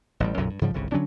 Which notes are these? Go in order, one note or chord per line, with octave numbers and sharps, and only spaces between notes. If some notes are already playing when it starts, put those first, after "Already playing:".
A1 A2 G3
B1 F#2 A#2 C#3
G2
G#2 C#3 F3 G3
G1 C2 C#3
D3 F#3 C#4 D4